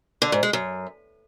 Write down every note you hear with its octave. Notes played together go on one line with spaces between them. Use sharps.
D3
G#2
G#3
F#2